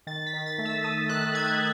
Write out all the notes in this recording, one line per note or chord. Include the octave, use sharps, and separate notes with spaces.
D#3 A6
B6
D#3
A6
A3
E6
A3 D#6
D#3 F#6
D#3 G#6